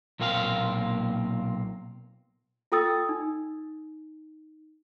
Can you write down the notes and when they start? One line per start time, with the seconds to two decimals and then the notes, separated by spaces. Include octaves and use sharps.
0.20 B1 A#2 A#3 C4 F#4 F5
2.72 F4 A4 G5 D#6 E6 A6
3.09 D#4